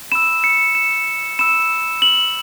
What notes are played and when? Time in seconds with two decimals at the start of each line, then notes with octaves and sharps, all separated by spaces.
0.12 B5 E6 E7
0.44 C#7
0.75 E7
1.39 B5 E6 E7
2.02 F#7